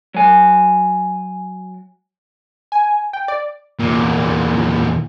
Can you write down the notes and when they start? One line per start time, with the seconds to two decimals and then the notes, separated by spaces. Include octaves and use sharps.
0.14 F#3 G#5
2.72 G#5
3.13 G5
3.28 D5
3.79 E2 A#2